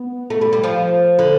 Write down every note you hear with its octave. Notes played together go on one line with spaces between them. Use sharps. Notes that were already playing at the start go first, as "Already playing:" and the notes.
Already playing: B3
A3
G3
G3
F3
D3